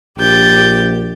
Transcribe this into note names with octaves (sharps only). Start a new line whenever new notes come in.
A#1 G4 G6 A6